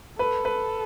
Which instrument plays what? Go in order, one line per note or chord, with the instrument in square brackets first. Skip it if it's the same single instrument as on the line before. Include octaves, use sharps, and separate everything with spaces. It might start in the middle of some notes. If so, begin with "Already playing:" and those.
[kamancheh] A4 [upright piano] B4
[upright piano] B4